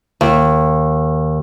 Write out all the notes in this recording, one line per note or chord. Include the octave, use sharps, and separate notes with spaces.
D#2